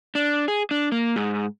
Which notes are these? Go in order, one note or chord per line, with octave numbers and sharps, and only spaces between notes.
D4
G#4
D4
A#3
G#2